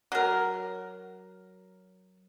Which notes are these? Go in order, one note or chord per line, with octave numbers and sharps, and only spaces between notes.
F#3 A#4